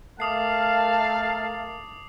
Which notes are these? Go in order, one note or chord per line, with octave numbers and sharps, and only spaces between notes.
A3 A#4 F5 A5 D6 D#6 C7